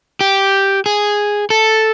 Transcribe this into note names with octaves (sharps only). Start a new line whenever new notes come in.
G4
G#4
A4